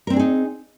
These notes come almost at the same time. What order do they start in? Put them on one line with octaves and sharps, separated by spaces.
A#4 C4 D4 G#4 D#4